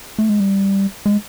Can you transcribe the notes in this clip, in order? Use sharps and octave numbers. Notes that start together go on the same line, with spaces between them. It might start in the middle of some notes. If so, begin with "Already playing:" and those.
A3
G#3
G3
G#3